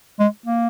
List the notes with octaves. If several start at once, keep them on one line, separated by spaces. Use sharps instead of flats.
G#3
A#3